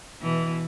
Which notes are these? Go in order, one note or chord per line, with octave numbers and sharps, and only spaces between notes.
B2 E3